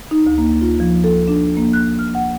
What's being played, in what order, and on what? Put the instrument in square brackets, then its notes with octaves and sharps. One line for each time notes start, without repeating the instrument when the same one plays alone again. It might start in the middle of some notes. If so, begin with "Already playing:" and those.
[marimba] D#4
D2
A#3
F4
F3
A4
D4
A#3
F#6
F6
F#5